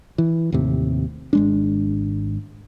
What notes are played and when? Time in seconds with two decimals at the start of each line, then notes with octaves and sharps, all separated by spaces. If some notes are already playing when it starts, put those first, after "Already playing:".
0.18 E3
0.52 D#2 A2 C3
1.33 G#1 G#3 D4